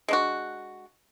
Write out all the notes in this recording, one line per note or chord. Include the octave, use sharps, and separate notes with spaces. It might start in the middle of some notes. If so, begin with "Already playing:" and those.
G#3 D4 F#4